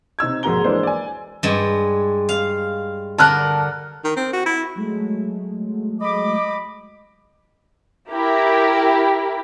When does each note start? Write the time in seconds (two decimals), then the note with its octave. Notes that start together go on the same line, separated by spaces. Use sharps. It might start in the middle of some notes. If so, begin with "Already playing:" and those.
0.19 C3 D#4 E6 G#6
0.43 A#1 G#2 A#3 F#4 A#5 G7
0.64 E3 G#3 A#3 D4 C5
0.83 D5 G#5
1.43 G2 G#3
2.29 F5
3.18 D3 A#4 A5 F6 F#6
4.04 D#3
4.16 C4
4.33 F#4
4.46 E4
4.75 F#3 G#3 A3
6.01 D#5 B5 D6
8.10 E4 G4 A#4